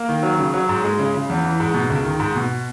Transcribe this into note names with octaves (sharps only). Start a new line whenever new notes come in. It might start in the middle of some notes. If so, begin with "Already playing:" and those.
Already playing: A#3
D#3
F#3
C#3
F#3
G#2
G#3
C#3
C#3
E2
E3
G#2
B2
C#2
D#3
G#2
B2